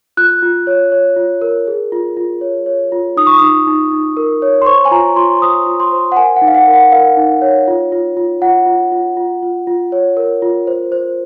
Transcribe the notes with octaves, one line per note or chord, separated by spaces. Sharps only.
F4 F#6
F4
C#5
C#5
F4
A#4
G#4
F4
F4
C#5
C#5
F4
D#4 D#6
C#6
D#4 D#6
D#4
D#4
A#4
C#5
C6
C5 C#6
G#5
F4 A#5
F4 C6
C5 D#6
F4
C6
C5
F#5
A#4 G#5
F#5
D#4
F5
F#5
A#4
F#5
A#4 F5
D#4
C#5
F4
F4
F4
F4 F#5
F4
F4
F4
F4
F4
C#5
A#4
F4
C5
C5